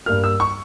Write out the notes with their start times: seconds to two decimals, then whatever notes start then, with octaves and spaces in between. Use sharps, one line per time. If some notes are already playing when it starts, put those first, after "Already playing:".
0.06 G2 G3 A#3 F6
0.24 E6
0.40 C#6